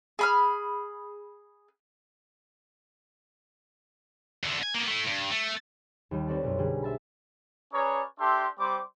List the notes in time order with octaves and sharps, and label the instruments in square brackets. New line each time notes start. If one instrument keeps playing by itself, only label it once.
[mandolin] G#4 B5 F6
[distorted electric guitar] E2 D3
G#5
A#3 B3
A3 E4
G2
A3
[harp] D#2 G3
C4 A4 B4 C#5 D5 A5
B1 F#2
D3 G3 G#4
C5 E5 A5 B5
[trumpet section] C#4 G#4 B4 C#5 D5 A#5
D4 G4 A4 E5 C6
G3 C4 C5 D6